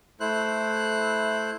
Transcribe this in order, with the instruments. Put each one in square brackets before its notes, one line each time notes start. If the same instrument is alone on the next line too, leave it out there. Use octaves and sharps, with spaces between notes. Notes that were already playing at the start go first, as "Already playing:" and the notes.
[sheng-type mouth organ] A3 E4 C5 F#6